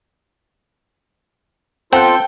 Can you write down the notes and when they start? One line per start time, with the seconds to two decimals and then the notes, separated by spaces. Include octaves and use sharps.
1.93 C4 F4 A4 C5 F#5 G5